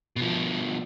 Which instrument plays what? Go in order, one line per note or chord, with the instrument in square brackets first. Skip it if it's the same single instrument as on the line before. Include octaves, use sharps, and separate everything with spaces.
[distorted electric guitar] B2 F3